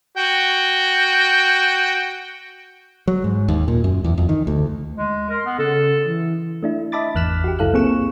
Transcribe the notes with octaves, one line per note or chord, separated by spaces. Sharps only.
F#4 G5
F#3
G#2
D#2
A#2
F#2
E2
F2
D#3
D2
G#3
A#4 C6
B3
C#3 A4
E3
A3 D4 E4
D#5 E5 A5 B5 D6 A6
G#1 E2 F6 F#6 B6 E7
F#4 G4
C#2 F#2 E4 A4 F5 F#6
A#3 C4 G#4 C#6 E7